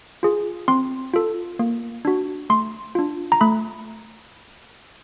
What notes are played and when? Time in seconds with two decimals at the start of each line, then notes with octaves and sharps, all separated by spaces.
0.23 F4 G#4
0.68 C4 C6
1.14 F4 A4
1.59 A#3
2.05 D4 F#4
2.50 A3 C6
2.95 D4 F4
3.32 A#5
3.41 A3 B5